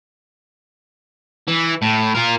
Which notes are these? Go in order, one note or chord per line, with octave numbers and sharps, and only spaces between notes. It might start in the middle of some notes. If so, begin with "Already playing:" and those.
E3
A2
F4 A#4